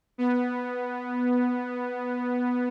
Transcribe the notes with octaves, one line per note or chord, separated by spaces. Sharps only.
B3